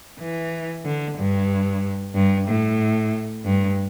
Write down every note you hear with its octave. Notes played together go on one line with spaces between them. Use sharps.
E3
D3
G2
G2
A2
G2